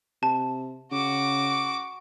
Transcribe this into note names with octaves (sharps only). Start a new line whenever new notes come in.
C3 A5
C#3 F#4 D6